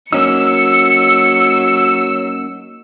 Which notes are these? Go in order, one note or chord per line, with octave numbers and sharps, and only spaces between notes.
F#3 A#3 C#4 D#4 E6 C#7